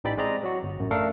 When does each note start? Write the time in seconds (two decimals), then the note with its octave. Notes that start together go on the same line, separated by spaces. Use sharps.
0.04 A1 E3 D#4 G4 D5 B5
0.17 G#3 C4 D5 D#5 A#5
0.43 F#3 F#4
0.63 G1
0.78 A1 F#2
0.91 A3 D4 A4 A#4 F5